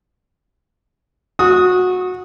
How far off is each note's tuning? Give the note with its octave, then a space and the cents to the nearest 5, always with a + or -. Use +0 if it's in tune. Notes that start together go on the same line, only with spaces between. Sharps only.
F#4 -20 D#6 +10